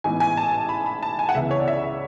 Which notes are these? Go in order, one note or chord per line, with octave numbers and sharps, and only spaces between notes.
A1 G#2 E3 B3 G#5
G#5
A5
B5
B5
A5
G#5
F#5
C#2 C#3 E3 B3 E4 E5
C#5
D5
E5
E5